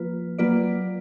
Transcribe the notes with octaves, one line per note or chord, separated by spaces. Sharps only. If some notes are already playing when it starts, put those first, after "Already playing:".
Already playing: F3 A#3 F4 B4
F#3 A#3 F4 B4 D5